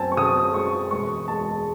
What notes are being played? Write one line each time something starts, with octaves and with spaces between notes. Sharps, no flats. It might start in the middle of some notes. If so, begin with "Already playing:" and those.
Already playing: F#2 C4 G#5 A5
C#6
C#3 D#6
G#3 C#6
E1 C#6
G#3 A5